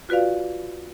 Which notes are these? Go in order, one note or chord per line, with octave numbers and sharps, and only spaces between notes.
F4 F#4 B4 D5 F5